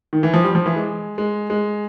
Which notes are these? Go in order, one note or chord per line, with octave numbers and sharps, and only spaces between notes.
D#3
E3
F3
G3
F3
E3
G#3
G#3
G#3